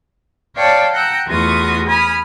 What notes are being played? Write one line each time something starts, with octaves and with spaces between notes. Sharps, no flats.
C#5 D5 F5 G5 A5
F#5 G5 A#5 E6 F#6 G6
E2 A3 F4 F#4 C#6 D#6
G#5 B5 D#6 F6